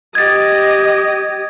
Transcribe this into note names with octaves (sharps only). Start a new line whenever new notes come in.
G4 D#5 G#6 A6